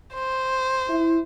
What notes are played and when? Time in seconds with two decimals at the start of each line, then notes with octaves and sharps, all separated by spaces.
0.14 C5
0.88 E4